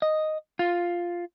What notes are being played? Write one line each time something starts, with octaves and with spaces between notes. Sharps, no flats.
D#5
F4